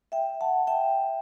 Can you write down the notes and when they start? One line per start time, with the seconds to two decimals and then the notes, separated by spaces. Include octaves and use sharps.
0.12 E5 G5
0.41 F#5 A5
0.67 E5 G5